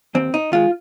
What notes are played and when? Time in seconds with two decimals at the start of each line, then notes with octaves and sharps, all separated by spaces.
0.15 D#2 C4
0.34 D#4
0.52 D#3 G#3 F4